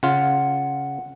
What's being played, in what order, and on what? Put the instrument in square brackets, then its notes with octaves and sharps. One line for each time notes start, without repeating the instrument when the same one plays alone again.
[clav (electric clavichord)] C#3 F4 [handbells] F#5